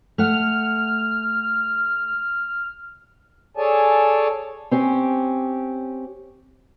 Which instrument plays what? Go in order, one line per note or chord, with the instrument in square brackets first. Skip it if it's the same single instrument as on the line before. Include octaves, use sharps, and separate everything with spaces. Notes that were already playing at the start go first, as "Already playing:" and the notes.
[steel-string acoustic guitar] A3 F#5 [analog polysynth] F6
[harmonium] G#4 A4 C#5 D5 G#5 A5
[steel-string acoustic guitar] C4 C#4 G4